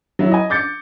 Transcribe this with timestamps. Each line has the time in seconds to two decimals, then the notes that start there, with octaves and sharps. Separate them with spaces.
0.19 F#3 E4
0.32 D#5 G#5
0.50 D6 G6 A6 C#7